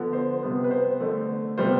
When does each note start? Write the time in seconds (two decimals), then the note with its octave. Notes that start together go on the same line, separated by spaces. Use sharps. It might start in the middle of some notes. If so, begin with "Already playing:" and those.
Already playing: D3 F3 B3
0.13 C5
0.43 C3 G3 B3
0.64 B4
0.71 C5
1.00 D3 A3
1.58 C3 G3 B3 C5